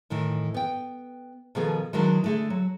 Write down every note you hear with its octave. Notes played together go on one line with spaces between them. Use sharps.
A2 D#3 E3
B3 G5
B2 D#3 F3 B3 G#4 A4
D#3 E3 F#3 G#3 D4 D#4
D3 A3 G#4
F#3